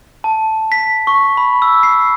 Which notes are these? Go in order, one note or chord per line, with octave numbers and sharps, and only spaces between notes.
A5
B6
C#6
B5
E6
C7